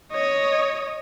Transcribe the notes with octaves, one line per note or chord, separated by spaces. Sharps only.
C#5 D#5